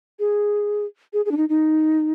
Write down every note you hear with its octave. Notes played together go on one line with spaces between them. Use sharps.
G#4
G#4
G#4
D4
D#4
D#4